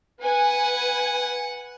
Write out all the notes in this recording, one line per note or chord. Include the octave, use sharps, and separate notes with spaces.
B4 F#5 G#5